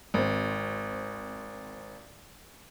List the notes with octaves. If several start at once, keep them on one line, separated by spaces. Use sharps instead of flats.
G#1 C4